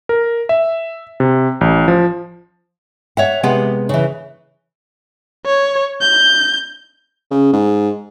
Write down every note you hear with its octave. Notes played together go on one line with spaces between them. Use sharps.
A#4
E5
C3
A1
F3
C#5 E5 F#5
C3 G#3 B3 G4 F#5
C#3 E3
C#5
G6
C#3
G#2